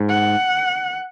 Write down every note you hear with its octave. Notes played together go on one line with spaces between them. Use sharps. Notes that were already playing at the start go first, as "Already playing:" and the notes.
Already playing: G#2
F#5